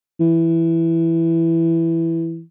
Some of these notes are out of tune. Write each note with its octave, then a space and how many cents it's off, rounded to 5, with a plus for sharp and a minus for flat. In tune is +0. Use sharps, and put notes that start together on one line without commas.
E3 +5